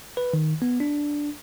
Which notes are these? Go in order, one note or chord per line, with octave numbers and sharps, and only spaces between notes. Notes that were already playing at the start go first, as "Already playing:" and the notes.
B4
D#3
B3
D4